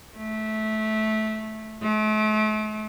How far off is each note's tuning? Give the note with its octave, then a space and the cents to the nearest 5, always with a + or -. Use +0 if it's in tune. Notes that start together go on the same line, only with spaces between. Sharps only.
A3 -15
A3 -40